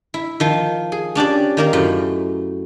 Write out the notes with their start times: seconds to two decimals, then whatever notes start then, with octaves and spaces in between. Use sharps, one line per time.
0.14 E4
0.40 D#3 F3
0.92 G#4
1.15 C#4 D4 G4 D5
1.57 D#3 A#3 A#4
1.73 F#2 A2